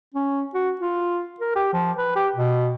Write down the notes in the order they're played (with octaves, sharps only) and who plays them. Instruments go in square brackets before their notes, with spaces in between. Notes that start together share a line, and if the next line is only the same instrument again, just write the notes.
[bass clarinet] C#4
F#4
F4
A#4
G4
F3
B4
G4
B2